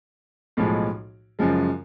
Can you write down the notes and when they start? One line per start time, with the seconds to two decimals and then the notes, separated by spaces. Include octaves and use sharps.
0.57 B1 A2 F3 G#3
1.39 F#2 C#3 F3 G#3